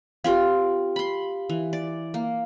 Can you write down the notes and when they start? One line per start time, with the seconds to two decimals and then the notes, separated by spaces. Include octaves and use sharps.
0.24 C4 F4 G4 A#4 F5
0.96 B5 C6
1.49 E3
1.73 D5
2.14 A#3